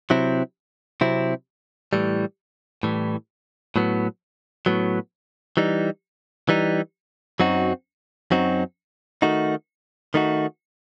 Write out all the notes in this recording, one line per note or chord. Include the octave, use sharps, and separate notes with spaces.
C3 F#3 C4 E4
C3 F#3 C4 E4
A2 E3 G3
A2 E3 G3
A2 F#3 B3
A2 F#3 B3
E3 G3 D#4
E3 G3 D#4
F#2 F#3 C4 D#4 F#4
F#2 F#3 C4 D#4 F#4
D#3 A3 D#4 F#4
D#3 A3 D#4 F#4